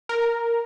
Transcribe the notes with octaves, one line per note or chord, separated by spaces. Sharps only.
A#4